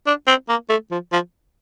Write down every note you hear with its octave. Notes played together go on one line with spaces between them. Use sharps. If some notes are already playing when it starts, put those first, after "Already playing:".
D4
C4
A#3
A3
F3
F3